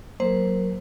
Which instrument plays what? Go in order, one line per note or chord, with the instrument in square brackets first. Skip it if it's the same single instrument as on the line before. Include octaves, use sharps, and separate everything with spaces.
[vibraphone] F#3 A#4 [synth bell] A#3 C5